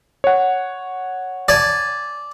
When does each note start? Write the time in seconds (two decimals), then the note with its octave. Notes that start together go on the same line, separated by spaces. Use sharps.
0.24 C#5 F#5
1.49 D5 G#5 A5